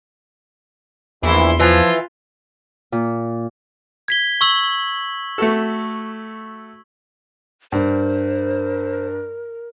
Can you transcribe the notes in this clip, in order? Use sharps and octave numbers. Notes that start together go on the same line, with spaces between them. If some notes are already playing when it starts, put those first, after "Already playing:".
A#1 E2 E3 E4 C6
E3 F3 F4
A#2
G#6 B6 G7
C#6 E6 F#7
A3 F#4 A4
G2 A#4 C5